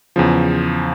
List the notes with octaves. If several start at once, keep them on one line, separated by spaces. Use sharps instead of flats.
E2 C#3 F3